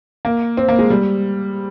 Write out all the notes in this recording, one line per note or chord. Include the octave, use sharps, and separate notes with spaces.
A#3
C4
A#3
G#3
G3